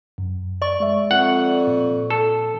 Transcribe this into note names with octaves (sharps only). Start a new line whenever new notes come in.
F#2
D5 C#6
G#3 E5
F2 F#5
A#2
A4